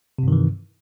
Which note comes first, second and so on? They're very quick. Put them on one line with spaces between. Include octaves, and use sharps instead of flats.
C3 G2 D#3 E3